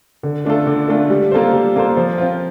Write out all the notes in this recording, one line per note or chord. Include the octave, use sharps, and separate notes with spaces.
D3
A3 D4 F4 A4
D3
A3 D4 F4 A4
G3
A#3 F4 A4 C5
G3
A#3 F4 A4 C5
F3
C4 F4